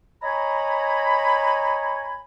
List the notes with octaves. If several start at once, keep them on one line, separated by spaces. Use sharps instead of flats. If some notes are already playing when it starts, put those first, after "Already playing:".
C#5 D#5 G#5 A#5 B5